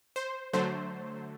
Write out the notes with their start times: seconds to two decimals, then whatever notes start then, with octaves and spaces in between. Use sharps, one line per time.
0.16 C5
0.53 D3 F#3 A3 C5